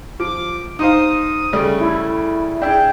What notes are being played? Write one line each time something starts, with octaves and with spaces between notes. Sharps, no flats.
F3 D6
D#4 C5 F5 D#6
C#3 G3 A3
E4
D4 E4 G#4 G5